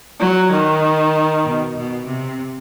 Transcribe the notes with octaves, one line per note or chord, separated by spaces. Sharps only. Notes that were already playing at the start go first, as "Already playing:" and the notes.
F#3
D#3
B2
B2
C3